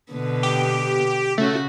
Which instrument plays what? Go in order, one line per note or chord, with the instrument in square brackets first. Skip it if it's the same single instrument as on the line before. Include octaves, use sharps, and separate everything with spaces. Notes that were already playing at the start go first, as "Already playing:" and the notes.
[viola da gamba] B2 D3 B3
[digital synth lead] G4
[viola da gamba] C#3 C#4 F#4 [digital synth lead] A3